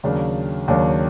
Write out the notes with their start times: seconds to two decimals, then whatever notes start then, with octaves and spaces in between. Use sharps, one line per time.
0.04 D#2 C#3 F#3 A#3 D4
0.68 D#2 C#3 F#3 A#3 D4